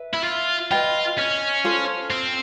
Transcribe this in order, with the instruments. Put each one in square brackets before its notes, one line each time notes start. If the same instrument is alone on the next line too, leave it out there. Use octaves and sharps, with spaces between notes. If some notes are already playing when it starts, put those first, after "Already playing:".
Already playing: [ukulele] B4 E5
[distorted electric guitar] E4
F4
[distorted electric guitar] F4 [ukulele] B4 D#5 G5 B5
[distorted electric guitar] C#4
[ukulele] F4 A4 C5
[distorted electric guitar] C4